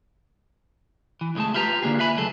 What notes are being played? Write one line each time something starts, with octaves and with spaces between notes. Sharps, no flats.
E3
C#2 A2 G#3 A3 A5
E4 F4 G4 B4 A#5
D3 A#3 D4 F4 G#4
B4 E5 G#5 B5
C#2 F#3 A3 G#4 A4